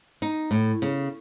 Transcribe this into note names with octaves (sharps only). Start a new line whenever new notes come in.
D#4
A2
C#3